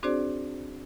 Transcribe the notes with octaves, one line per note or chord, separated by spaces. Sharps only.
C4 D4 F#4 G#4 C5 D5